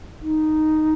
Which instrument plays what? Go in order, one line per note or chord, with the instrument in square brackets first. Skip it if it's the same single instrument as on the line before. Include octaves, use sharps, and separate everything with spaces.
[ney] D#4